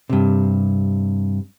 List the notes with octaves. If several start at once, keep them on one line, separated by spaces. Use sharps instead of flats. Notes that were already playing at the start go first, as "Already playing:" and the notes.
G2 C3